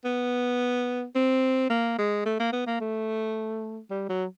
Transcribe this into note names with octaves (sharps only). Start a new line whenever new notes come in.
B3
C4
A#3
G#3
A3
A#3
B3
A#3
A3
G3
F#3